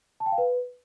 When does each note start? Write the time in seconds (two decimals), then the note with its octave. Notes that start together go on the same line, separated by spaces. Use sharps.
0.20 A5
0.26 G5
0.32 F5
0.38 B4